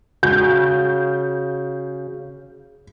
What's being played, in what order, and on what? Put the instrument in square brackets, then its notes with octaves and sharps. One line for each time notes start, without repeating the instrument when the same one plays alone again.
[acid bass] C#3 [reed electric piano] F#4 [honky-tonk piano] G6